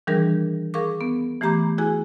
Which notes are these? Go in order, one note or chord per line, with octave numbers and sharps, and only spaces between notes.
D#3 E3 G3 D4 G#4 A#4
G#4 A#4 F5 C#6 D6
B3
E3 A3 G4 A#5 B5 D6
E4 F#4 G#4 G#5